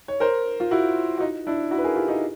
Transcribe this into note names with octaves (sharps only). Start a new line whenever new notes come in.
C#5
A#4 C5
F4
E4 F#4
F#4
D#4 F4
D4 E4
E4 F#4
B4
G#4 A#4
F4 G4
D#4 F4